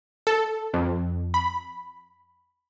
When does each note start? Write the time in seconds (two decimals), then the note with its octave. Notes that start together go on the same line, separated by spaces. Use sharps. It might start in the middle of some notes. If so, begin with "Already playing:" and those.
0.27 A4
0.74 F2
1.34 B5